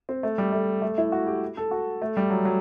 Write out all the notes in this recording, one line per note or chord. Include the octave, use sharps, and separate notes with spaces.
C4
A3
G3
A3
A3
E4
F#4
G4
A4
F#4
A3
G3
F#3
F#3